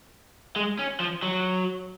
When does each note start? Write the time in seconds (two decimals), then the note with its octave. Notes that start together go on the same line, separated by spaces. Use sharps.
0.56 G#3
0.79 C#4
1.00 F3
1.23 F#3